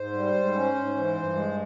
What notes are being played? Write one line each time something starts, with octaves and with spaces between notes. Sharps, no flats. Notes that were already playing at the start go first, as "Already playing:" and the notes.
Already playing: G#2 C5
G3
G#2
C#4
G#2
E3
G2
G#3